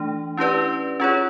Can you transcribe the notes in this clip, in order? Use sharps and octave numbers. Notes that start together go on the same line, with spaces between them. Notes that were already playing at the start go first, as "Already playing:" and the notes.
Already playing: E3 A3 D4
C#4 E4 G4 B4 D5
C#4 F4 G#4 C#5